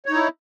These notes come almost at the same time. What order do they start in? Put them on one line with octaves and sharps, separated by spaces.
C#5 D#4 E4